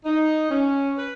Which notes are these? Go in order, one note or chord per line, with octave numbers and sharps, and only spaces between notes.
D#4
C#4
B4